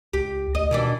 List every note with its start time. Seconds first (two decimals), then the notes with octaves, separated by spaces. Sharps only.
0.13 C#2 G4
0.55 D2 D#5
0.71 D#2 B2 E3 D4